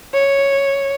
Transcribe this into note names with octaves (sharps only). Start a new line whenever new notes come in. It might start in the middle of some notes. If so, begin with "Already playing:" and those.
C#5